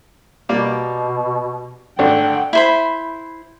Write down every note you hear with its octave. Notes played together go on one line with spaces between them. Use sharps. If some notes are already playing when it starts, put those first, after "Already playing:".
B2 G3 A#3 D5
G#1 A3 D4 F#5 G5
E4 C5 B5